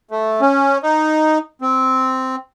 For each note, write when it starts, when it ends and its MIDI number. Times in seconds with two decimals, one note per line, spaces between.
0.11 0.41 57
0.41 0.78 61
0.83 1.38 63
1.62 2.36 60